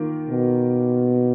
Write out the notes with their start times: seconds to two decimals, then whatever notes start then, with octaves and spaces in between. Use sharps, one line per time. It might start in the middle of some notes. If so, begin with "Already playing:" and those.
Already playing: D#3 A#3 F4
0.29 B2